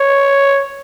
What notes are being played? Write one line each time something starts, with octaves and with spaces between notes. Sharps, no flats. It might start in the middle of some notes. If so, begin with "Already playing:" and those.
Already playing: C#5